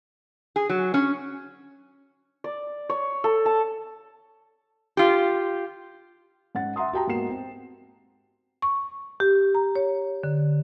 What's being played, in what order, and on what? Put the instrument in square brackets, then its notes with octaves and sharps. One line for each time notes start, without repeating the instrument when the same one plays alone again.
[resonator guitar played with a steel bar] G#4
F#3
C#4
[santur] D5
C#5
A4
A5
[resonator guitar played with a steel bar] F4 G4
[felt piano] G#2 C#4 F#5 A6
E5 F#5 A#5 C6 D#6
F#4 G4 G5 A5 A#5
G#2 A#3 B3 F#4 C7 E7
C4
[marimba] C#6
G4
A#5
C#5
D3